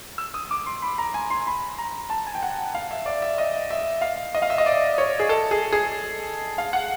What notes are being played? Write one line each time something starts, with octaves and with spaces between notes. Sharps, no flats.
E6
D#6
D6
C6
B5
A#5
G#5
C6
B5
A#5
A5
G#5
G5
F#5
F5
E5
D5
E5
D#5
E5
F5
D#5
F5
E5
D#5
D5
C#5
G#4
A4
G#4
G#4
F5
F#5